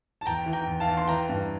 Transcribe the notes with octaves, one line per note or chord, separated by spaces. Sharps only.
A5
E2 G5 A#5
E3
G5 A#5
E2
F5 A5
E2
C6
E3 G5 A#5
G2